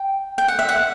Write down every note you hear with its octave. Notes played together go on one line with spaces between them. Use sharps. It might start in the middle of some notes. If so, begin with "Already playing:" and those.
Already playing: G5
G5
F#5
E5
F#5